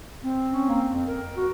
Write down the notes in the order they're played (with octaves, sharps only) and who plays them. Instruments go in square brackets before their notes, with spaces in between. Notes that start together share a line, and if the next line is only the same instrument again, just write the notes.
[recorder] C4
[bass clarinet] C#4
A#3
F2
[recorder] A#4
[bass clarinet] F#4